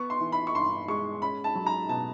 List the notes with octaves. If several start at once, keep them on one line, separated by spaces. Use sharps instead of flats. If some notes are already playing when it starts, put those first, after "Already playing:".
Already playing: B3 C#6
C6
E3
B5
C#6
G2 C6
G#3 C#6
C#4 B5
A5
F#3
A#5
B2 A5